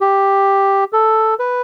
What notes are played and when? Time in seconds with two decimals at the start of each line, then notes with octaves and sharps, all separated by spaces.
0.01 G4
0.93 A4
1.39 B4